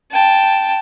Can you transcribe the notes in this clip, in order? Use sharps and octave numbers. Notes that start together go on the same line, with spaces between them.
G5 A5